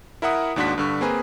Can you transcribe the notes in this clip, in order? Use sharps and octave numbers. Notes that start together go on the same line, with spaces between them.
E4 A#4 E5 F#5 D#6
D#2 G#2 D4 F#4 C6 B6
G2 D3 C#6
A#3 C4 G#4 B4 A#5